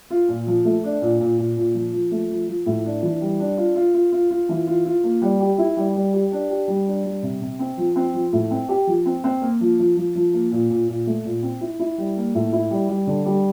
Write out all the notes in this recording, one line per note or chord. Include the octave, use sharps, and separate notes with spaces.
F4
A#2
F3
A3
D4
A#2
A#2
A#2
A#2
F3
F3
A3
F3
F3
A2
D4
E3
G3
D4
F4
F4
F4
F4
F4
E3
F4
F4
A#3
G3
G4
E4
G3
G3
G4
D4
G4
G3
D4
G3
C3
C3
C4
F3
C4
F3
A2
C4
G4
F3
C4
C4
A#3
F3
F3
F3
F3
A#3
A#2
A#2
A#2
A3
A#2
C4
E4
E4
G3
A#3
A2
E4
G3
G3
D3
G3